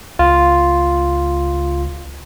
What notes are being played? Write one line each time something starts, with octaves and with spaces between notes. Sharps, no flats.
C#2 F4